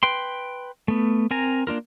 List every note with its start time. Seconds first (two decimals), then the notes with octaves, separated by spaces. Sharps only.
0.03 B4 G5 C6
0.88 A3 B3
1.31 C4 A#4 G#5 A#5
1.67 A#3 D4 F4 A#4